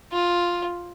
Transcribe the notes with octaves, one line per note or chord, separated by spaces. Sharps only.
F4